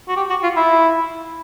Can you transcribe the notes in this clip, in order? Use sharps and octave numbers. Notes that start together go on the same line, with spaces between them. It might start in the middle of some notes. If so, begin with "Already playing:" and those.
F#4
G4
F#4
F4
E4